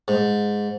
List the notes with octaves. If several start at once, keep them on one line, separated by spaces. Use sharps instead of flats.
G#2